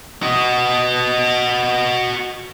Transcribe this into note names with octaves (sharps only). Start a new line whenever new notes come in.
F#4 D#5